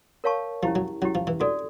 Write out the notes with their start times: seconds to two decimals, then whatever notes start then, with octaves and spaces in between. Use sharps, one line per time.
0.24 A#4 C#5 F5 A5 C#6
0.63 F3 C#4 E4 G4
0.75 F#3
1.02 F#3 C#4 E4 G4
1.15 F3
1.27 E3
1.40 D3 F#4 A4 D5